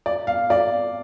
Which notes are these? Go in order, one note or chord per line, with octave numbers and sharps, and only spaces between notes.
D5
F5
D5